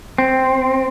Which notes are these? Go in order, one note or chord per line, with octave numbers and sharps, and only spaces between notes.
C4